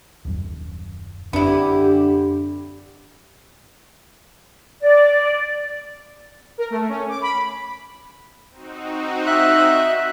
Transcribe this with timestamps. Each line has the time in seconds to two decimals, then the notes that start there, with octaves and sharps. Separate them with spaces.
0.25 D#1 F#2
1.33 F#2 D3 B3 C4 D4 E4 G4
4.81 D5
6.58 A#4
6.70 A3
6.89 C#4
7.09 D6
7.21 B5
8.50 C4 D#4 F#4
9.27 E5 F#6